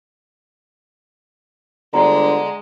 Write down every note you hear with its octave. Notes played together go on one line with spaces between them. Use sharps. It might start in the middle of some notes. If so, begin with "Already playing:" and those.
G1 D3 G#3 D5 A#5